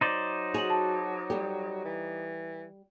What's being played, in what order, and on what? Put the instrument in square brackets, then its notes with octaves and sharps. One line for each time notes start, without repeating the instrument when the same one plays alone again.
[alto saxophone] F#3 [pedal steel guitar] D#4 C5 D5
[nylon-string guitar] F#4 G#4 [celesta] F7 F#7
[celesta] A5
[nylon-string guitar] G3 G4 [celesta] A4
[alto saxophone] E3